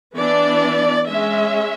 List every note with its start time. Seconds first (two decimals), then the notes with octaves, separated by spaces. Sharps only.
0.18 E3 B3 D4 D5
1.09 G#3 C#4 E5